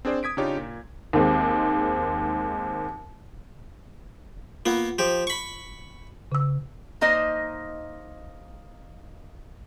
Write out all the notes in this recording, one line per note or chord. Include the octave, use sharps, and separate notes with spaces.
C4 D4 G#4 C5 D5
D#6 G#6 B6 D7
C#3 D4 D#4 F4 G4 C#5
A#2
D#2 D#3 G#3 C4
A#3 B3 F4
F3 G4
B5 C#6
C#3 E6
A#3 D#4 C5 D#5